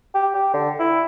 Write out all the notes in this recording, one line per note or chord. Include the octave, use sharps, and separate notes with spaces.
G4
G4
D3
E4